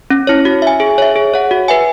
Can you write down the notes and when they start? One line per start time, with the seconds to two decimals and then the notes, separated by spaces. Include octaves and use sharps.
0.10 C#4
0.27 E4 C#5
0.45 F#4
0.62 E5 G#5
0.80 G#4
0.98 C#5 E5
1.16 G#4
1.34 C#5 F#5
1.51 F#4
1.68 B4 E5 G#5